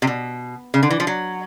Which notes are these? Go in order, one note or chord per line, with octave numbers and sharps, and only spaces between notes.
C3
B2
C#3
D3
E3
F3
F#3